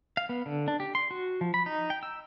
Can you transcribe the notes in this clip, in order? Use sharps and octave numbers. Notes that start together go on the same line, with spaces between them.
F5
B3
D3
D4
G4
C6
F#4
F3
B5
D#4
G5
E6